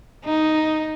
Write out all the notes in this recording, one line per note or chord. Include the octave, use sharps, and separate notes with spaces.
D#4